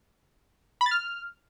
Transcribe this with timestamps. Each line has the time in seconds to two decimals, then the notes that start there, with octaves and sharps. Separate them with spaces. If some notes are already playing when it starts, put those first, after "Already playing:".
0.81 B5
0.86 A6
0.91 F6